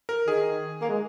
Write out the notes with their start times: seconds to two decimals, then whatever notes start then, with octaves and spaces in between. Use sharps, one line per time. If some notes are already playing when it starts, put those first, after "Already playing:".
0.09 A#4
0.27 D#3 G#4
0.82 A#3
0.89 G#3